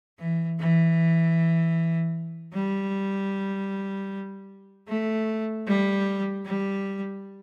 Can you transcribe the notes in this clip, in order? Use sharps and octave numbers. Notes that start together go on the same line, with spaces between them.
E3
E3
G3
A3
G3
G3